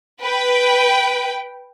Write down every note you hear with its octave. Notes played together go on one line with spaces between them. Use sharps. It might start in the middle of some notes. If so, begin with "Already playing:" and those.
B4 G5